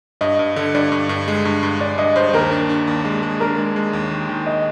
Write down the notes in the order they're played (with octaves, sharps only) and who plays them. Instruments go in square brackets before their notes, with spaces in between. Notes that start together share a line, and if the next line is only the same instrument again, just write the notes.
[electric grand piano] G2 [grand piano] D#5
[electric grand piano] G2
D3
[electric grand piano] G2 [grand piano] D5
[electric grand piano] G2
G2
G#3
G2
G2
[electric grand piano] G2 [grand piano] D5
[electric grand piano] G2 [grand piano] D#5
[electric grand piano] G2 [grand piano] C5
[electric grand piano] D#2 [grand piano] A#4
[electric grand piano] D4
D4
D#2
G#3
G#3
[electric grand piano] D4 [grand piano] A#4
[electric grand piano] G#3
G#3
D#2
D#3
D#3
[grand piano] D#5